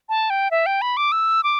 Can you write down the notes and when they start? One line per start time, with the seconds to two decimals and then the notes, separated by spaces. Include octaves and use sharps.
0.09 A5
0.30 G5
0.51 E5
0.66 G5
0.82 B5
0.97 D6
1.12 E6
1.44 D6